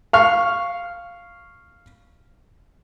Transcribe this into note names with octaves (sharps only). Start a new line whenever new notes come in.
F5 C#6 F6